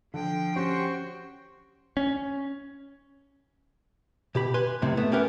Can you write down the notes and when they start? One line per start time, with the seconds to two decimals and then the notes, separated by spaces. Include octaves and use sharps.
0.14 D3 F3 G5
0.56 C#4 F#4 G4 C5 C#6
1.97 C#4
4.35 B2 G4 B5
4.54 B4 G#5 C6
4.82 C#2 F#2 A2 C3
4.97 A3 B3
5.11 A3 B3 C#4 G4 A#4 B4